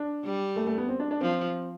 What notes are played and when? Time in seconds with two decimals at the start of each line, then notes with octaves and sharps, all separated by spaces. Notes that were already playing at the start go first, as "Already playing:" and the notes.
Already playing: D4
0.24 G3
0.56 A3
0.67 A3
0.78 B3
0.89 C4
1.00 D4
1.11 D4
1.21 F3 C4